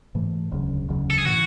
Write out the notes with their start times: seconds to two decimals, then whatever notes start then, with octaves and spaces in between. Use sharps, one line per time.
0.15 G#2 E3 A3
0.51 E1 D2 C#3 F#3
0.89 E1 D2 C#3 F#3
1.10 A4
1.18 G#4
1.26 A2 E3 F#4